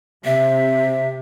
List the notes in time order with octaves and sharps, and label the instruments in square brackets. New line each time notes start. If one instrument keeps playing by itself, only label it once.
[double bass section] C3 [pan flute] E5